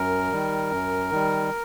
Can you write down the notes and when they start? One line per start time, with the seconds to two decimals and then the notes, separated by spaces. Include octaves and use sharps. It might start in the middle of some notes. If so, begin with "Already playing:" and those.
Already playing: F#2 A#4
0.32 D#3 G3
0.72 F#2
1.11 D#3 G3